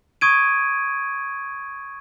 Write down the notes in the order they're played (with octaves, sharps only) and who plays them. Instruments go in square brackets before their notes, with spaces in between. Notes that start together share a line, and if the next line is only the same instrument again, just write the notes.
[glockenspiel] C#6 D#6 G#6 D7 D#7